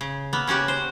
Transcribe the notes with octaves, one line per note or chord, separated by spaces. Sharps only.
C#3
A#3 B3
C#3 C#4 F#4 G4
C5